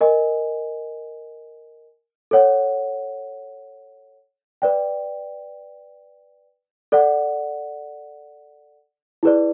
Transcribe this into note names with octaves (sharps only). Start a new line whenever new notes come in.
A#4 D#5 G#5
A4 C#5 F#5
B4 D5 G5
A4 D5 F#5
E4 G#4 B4 D5